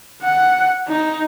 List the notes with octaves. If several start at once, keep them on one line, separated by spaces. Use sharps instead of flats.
F#5
D#4